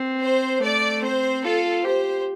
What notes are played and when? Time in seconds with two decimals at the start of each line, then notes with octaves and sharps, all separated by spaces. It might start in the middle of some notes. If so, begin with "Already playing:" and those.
Already playing: C4
0.22 C5
0.63 A3 D5
1.03 C4 C5
1.44 F4 A4
1.85 G4 C5